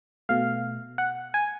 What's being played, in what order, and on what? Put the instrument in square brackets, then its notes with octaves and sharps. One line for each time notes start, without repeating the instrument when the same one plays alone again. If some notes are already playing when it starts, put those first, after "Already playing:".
[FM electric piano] B2 A3 F5
F#5
G#5